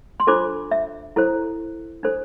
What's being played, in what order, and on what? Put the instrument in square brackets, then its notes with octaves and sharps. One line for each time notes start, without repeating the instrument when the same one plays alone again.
[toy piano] C6
D4 F4 A4 C5 D6
E5
E4 A4 C5
D4 A4 C5